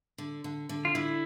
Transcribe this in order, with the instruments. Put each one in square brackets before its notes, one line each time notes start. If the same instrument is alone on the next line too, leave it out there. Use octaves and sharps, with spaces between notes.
[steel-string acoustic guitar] D3
D3
D3
[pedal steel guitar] F4
[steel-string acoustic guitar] D3 [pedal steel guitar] E4